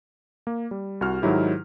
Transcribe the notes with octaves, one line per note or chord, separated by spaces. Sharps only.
A#3
G3
C2 F#4 F6
G#2 D#3 F#3 E4 G4